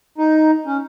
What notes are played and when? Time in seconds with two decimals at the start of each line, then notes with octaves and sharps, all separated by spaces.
0.18 D#4
0.66 C#4